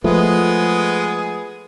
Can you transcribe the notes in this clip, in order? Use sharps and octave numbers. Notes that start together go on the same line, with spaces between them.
F3 G#3 A3 B3 G#4